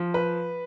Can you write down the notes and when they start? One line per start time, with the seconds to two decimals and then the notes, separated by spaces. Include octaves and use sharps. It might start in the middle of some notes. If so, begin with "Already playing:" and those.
Already playing: F3
0.14 B4